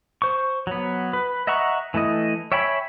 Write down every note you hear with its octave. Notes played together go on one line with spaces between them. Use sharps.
C5 C#6
F#3 B3
B4
D#5 E5 F#5 A#5 C#6
E3 A3 E4 D#5
C#5 E5 G5 G#5 B5